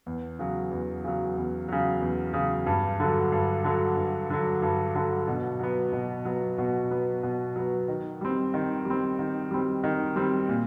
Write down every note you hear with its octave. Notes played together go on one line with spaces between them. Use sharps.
E2
C#3 F#3
E2
C#3 F#3
E2
C#3 F#3
E2
C#3 F#3
G2
D3 F#3
G2
D3 F#3
G2
D3 F#3
G2
D3 F#3
B2
F#3 B3
B2
F#3 B3
B2
F#3 B3
B2
F#3 B3
D#3
G3 C4
D#3
G3
C4
D#3
G3 C4
D#3
G3 C4
A#2